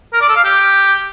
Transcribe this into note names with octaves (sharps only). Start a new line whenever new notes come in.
A#4
D5
A4
F5
G4